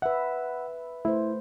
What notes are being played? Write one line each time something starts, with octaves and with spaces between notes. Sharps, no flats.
B4 E5 F#5
A3 E4 C5